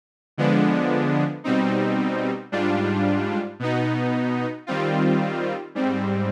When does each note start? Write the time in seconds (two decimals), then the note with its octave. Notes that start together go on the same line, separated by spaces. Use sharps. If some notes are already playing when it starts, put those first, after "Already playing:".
0.38 D3 F3 G#3 B3 D4
1.44 B2 G3 C4 D#4
2.52 G#2 G3 D4 F4
3.59 B2 B3 D#4
4.67 D#3 G3 C4 F4
5.75 G#2 G3 C4